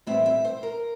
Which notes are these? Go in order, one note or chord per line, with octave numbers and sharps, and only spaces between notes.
A2 E3 G3 C4 E5
E5
C5
A#4